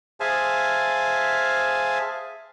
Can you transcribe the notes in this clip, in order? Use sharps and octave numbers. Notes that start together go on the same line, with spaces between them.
G#4 C5 E5 F5 G#5 A5